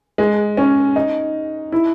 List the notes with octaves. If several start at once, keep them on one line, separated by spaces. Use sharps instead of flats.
G#3
C#4
D#4
E4